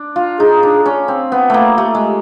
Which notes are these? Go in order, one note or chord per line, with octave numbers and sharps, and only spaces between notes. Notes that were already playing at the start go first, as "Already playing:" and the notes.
Already playing: D4
F4
D#4 G#4
D4
C#4
C4
B3
A3 A#3
A3 G4
G#3